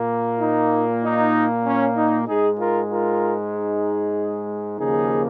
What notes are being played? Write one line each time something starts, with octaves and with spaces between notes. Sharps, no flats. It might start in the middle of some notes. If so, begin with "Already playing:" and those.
Already playing: A#2 A#3
D#4
D#4
C#4
D#4
G#2 G#3 D#4 G#4
F4 A#4
F4 A#4
D#4 G#4
D#2 C#3 F3 A#3 D#4 G#4